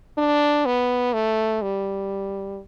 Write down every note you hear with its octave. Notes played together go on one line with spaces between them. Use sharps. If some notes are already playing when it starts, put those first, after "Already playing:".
D4
B3
A3
G3